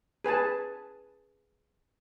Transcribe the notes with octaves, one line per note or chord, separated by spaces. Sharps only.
G#4 B4 G#5 A5